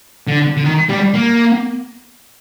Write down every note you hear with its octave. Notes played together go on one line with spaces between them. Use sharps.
D3
D3
D#3
G3
A#3